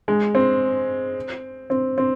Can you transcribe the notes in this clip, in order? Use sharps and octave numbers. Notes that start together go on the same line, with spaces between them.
G#3
C4
C4
C4